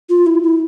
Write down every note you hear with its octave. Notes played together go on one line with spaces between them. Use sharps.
F4
E4
E4